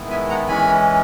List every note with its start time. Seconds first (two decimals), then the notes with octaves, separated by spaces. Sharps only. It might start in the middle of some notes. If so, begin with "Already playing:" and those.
Already playing: D#3 G#3 B3 E4
0.10 E5 G#5
0.30 F#5 A#5
0.48 E3 G#3 C#4 G#5 B5